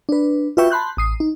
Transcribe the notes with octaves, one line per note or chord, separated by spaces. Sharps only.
D4 B4
F4 F#4 B4 E5 G5 C#6
A5 B5 C6 F#6 G6
A1 D#6 C7
D#4